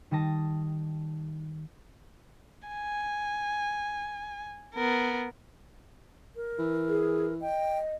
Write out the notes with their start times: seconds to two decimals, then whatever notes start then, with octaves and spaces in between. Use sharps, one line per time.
0.11 D#3 G3 D#5 A5 A#6
2.68 G#5
4.75 B3 A#4
6.36 A#4
6.59 E3
6.88 G#4
7.41 D#5 G5